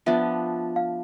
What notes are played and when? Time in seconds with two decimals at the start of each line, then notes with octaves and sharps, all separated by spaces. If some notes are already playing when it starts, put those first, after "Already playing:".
0.06 F3 B3 D4 E5
0.76 F5